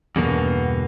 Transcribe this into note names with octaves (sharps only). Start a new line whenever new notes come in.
E2 G2 B2 D3 A#3 B3